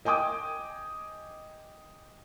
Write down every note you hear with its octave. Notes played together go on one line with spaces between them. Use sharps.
D#5 G5 G#5 D6 D#6